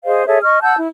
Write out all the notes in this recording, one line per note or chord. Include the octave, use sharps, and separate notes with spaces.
G#4 C5 D#5 F5
G#4 A4 C#5 E5
D#5 C#6 F6
F#5 A5 E6 G6
E4